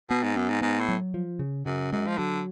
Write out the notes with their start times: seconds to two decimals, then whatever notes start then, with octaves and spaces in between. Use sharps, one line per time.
0.10 B2 B3
0.23 G#2
0.36 F#2 B3
0.49 G#2
0.61 G#2 B3
0.80 A2
0.89 F#3
1.14 F3
1.39 C#3
1.66 F#2 C#3
1.92 F#2 G#3
2.07 F3
2.18 D3 F#3